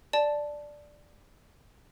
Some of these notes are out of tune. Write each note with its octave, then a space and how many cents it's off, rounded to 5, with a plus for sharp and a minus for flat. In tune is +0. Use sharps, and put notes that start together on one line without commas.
D5 +0 A5 -5